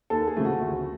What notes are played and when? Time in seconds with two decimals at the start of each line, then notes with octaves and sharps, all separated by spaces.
0.10 D#2 A4
0.27 G#4
0.36 C#3 F3 A3
0.45 F#4
0.62 D2